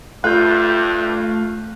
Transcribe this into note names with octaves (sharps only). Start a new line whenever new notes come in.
G2 A3 F4 F#6 G6